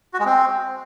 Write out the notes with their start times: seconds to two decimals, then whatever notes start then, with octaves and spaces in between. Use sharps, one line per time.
0.14 F#4
0.20 G#3
0.25 C4